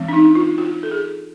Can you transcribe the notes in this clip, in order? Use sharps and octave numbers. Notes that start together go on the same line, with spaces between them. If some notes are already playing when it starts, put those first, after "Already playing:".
Already playing: E3 G#3 C4
D4
D#4
F4
F#4
A4
G#4